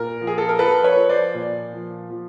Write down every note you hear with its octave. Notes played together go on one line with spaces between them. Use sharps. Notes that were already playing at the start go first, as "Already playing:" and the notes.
Already playing: A#2 A#4
F3
G#4
A4
A#4
F3 A4 B4
B4 C#5
F3
C5 D5
A#2
F3
F3